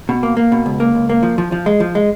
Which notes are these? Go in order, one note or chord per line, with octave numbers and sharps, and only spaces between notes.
B2
A#3
A#3
B2
C#2
A#3
C#2
A#3
F3
F3
F3
G#3
F3
G#3